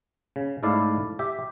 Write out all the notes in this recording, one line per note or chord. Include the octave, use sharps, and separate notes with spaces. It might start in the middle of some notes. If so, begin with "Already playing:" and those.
C#3
G#2 A3 E4 D5 F5
G4 E5